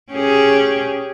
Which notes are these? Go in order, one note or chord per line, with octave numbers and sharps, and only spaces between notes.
C#4 G4 G#4